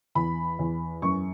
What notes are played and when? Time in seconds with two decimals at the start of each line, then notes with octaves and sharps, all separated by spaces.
0.15 E2 B5
0.59 E2
1.02 F#2 C#6